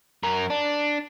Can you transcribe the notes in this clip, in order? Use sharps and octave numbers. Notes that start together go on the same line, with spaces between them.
F#2 A#4
D4